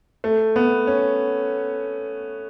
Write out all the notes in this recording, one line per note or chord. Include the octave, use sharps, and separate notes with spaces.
A3
B3
C#4